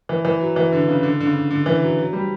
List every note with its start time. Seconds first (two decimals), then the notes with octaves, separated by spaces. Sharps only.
0.09 E3
0.25 E3
0.41 F#3
0.56 E3
0.73 D3
0.88 C#3
1.03 D3
1.20 D3
1.27 C#3
1.50 D3
1.66 E3
1.82 F#3
1.98 F#3
2.13 G3